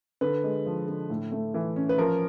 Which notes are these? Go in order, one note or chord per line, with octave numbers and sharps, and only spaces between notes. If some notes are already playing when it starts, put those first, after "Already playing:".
D3 B4
G#3
F3
D3
A2
A3
E3
C#4
B4
F3 A#4